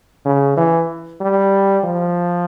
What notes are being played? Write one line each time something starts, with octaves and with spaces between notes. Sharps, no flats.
C#3
E3
G3
F3